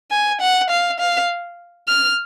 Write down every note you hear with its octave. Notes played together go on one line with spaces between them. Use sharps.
G#5
F#5
F5
F5
F6